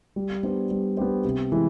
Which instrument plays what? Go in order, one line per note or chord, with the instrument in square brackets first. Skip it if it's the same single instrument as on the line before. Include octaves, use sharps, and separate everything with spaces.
[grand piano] G3
B3 D4 G4 C5
G3
B3 D4 G4 C5
C3
E3 G#3